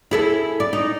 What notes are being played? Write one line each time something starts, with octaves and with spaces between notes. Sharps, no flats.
E4 G#4 A4
D5
D#4